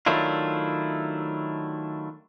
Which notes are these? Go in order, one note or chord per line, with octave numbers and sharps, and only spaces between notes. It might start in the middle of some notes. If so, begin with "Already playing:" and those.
D#3 F#3 A3 D4 E4 F4